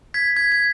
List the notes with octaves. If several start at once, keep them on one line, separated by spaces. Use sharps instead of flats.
G#6 B6
G#6
G#6